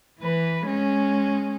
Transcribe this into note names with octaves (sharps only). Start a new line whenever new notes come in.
E3 B4
G#3 C#4